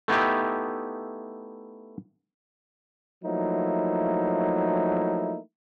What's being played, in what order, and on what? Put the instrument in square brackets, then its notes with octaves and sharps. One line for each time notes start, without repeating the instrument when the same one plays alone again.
[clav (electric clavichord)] A3 B3 D#4 E4 G4
[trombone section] F3 F#3 A3 A#3 D#4 E4